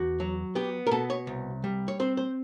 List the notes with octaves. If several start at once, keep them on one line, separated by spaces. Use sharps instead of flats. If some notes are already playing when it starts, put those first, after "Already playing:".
Already playing: E2 F#4
F#3
B3 G4
A#4
B2 A4
C#5
C2
G3
C#5
C4 C5
C5